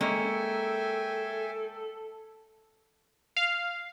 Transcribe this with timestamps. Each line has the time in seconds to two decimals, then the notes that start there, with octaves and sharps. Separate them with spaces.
0.01 G#3 A#3 C#4 A4 E5 G5 G#5
3.37 F5